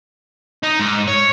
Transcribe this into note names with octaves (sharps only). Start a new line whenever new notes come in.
D#4
G#2
C#5